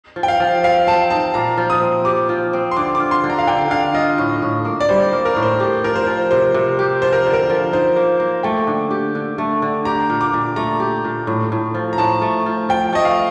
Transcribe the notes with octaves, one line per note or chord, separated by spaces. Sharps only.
F3
G5
F5
F3
C4 F5
C4 A5
D#4 A5
A#2 A#5
F3
D#6
C4
G4 D6
F3
C4
C6
D3 D6
D6
F4
C6
D3
A#5
F5
D3 G5
D3 F5
F4 D#5
A2
A2
A#3
D5
G3 C5
A#3
A#4
A2
C5
G4
F3 A#4
C5
F3
C3 C5
C3
G4
F3 C5
A#4
D3
A#4
F3
D#4 C5
A#3
A#3
A3 G5
D3
G4
D3
A3
D3
G4 A#5
A#2
D6
A#2
A3 A#5
G4
A#2
A2
A2
F3
A#5
A2 A5
A3
F3
F3 G5
A3 D#5
F5